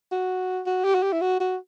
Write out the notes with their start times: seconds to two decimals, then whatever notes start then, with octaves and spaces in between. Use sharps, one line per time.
0.12 F#4
0.67 F#4
0.84 G4
0.95 F#4
1.03 G4
1.13 E4
1.21 F#4
1.40 F#4